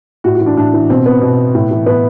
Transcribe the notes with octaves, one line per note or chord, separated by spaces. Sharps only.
A2 F#4
F#4
E3
D4
A2 D4
E3
B2 C4
B3
B2
A2
E3
A2 B3